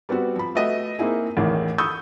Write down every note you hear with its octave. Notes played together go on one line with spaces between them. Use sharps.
G3 B3 C4 F#4
F3 B5
A3 F#4 B4 D#5 E5
A#3 C4 D#4 E4 G#4
A1 E2 A2 D#3
B5 C#6 D#6 E6 G6